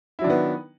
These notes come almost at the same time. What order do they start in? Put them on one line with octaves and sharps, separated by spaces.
E4 F#3 D4 D#3 B3